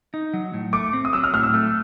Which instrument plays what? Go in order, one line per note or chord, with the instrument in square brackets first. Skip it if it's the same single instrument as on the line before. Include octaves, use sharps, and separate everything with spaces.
[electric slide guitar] D#4
F#3
A2
[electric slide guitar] A3 [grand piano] D6
[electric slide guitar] C4
[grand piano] D#6
[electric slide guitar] F#3 [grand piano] E6
[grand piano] F6
[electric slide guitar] A2 [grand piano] F6
[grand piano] E6
[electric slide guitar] A3